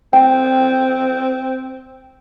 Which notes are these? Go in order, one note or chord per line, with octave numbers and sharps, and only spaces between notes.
C4 G5